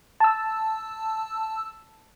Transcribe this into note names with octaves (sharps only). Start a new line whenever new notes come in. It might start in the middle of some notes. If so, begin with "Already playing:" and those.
A5 E6